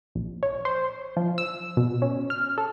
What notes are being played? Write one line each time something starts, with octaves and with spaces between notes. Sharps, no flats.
A#1
C#5
C5
F3
E6
B2
C#4
F6
A4